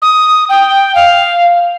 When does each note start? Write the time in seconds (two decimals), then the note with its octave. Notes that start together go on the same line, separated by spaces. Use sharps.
0.02 D#6
0.49 G5
0.95 F5